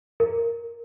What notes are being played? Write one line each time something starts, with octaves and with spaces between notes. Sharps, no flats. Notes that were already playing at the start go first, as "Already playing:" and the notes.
A#4